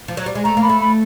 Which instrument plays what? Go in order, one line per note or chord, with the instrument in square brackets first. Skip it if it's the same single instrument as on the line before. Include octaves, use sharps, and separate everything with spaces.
[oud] F3
F#3
G3
G#3
[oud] A3 [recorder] A#5
[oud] A#3
[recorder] B5
[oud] A3
[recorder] B5